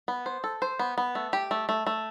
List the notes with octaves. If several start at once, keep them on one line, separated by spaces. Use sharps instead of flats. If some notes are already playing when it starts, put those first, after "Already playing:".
B3
C5
A4
C5
B3
B3
A3
G4
A3
A3
A3